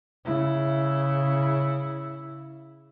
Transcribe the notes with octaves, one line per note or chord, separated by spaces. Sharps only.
C#3 E4